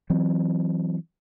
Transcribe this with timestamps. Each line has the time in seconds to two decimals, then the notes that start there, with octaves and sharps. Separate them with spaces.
0.10 E3 F#3 C4